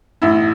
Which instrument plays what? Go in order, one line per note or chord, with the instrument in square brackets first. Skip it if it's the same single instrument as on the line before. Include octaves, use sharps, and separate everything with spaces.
[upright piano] A1 E4